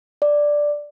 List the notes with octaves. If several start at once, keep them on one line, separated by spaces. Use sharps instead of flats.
D5